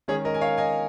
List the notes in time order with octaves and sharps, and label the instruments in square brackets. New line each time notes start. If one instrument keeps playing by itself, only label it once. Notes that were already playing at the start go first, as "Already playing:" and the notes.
[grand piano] D#3 G#3 C#4 G#4 C#5
A#4 D#5
G#5
C#5 F5
D#5 G#5